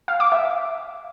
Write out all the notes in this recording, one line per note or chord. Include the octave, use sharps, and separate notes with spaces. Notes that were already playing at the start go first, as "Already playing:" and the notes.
F5
D6
E5